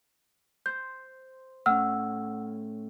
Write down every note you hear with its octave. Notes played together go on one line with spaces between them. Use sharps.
C5 G6
A2 C#4 F#5 E6 F6